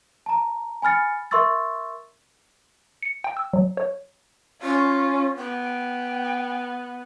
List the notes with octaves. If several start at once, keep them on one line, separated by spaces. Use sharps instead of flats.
A5 A#5
G#5 B5 F6 A6 C#7
A#4 E5 C6 C#6 E6 A6
C#7
G5
E6
F#3
C#5
C#4 F4
B3 G5